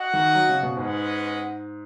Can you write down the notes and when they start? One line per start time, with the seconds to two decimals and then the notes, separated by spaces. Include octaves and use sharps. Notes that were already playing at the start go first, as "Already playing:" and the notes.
Already playing: F#4 D#5 F#5
0.13 D#3
0.35 F#3
0.49 C#3
0.63 B2
0.76 G#2 G#3 C#4 B4 F#5